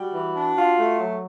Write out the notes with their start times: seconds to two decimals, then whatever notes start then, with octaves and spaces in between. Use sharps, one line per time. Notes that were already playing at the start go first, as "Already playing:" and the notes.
Already playing: G3 F#4
0.14 E3
0.35 D4
0.57 F4
0.78 A3
1.00 F#3